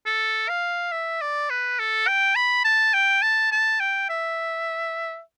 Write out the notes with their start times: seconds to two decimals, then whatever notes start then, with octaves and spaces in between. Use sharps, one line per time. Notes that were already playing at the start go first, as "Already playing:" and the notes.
0.06 A4
0.49 F5
0.92 E5
1.21 D5
1.50 B4
1.79 A4
2.07 G5
2.36 B5
2.65 A5
2.94 G5
3.22 A5
3.52 A5
3.80 G5
4.09 E5